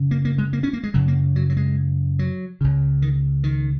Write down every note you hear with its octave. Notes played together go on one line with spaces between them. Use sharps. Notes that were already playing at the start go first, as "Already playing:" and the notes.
Already playing: F#2 C#3
A#3
A#3
G#3
A#3
C#4
A#3
G#3
F#2 C#3 F#3
A#3
F#3
F#3
G#3
F#3
C#2 C#3
D#3
D#3